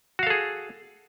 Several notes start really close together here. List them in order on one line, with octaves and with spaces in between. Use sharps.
F#4 F5 A4 G#4